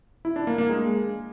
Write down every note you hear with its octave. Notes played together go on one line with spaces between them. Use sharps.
E4
D4
A#3
A#3
G#3